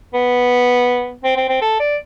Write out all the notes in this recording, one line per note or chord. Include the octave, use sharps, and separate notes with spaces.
B3
C4
C4
C4
A4
D5